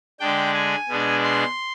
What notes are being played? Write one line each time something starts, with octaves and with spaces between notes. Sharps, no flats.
D3 G#3 D4 G5
G#5
B2 G#3 D4
C6